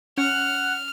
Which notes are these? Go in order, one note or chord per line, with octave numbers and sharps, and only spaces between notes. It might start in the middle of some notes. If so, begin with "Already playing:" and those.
C#4 F#5 F6